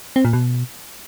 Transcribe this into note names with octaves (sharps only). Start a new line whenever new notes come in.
C4
A#2
B2